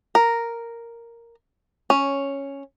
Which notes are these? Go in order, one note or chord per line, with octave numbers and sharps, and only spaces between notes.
A#4
C#4